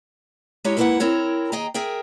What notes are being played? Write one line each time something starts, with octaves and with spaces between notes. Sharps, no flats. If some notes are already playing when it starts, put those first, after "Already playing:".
G#3 D#4 E4 G4 C#5
G#2 A#3 E4 A#4 B4 F#5
C4 E4 A#4 C#5
D#2 G#4 D#5 G5 A#5
G#4 A#4 E5 G5